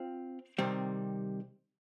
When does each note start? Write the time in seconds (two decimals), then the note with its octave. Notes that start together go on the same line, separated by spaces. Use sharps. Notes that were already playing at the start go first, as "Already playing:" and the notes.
Already playing: C4 F4
0.58 C3 D#3 G3 C4